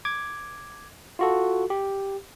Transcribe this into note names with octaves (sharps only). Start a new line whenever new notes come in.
D6 G#6
F4 F#4 A4
G4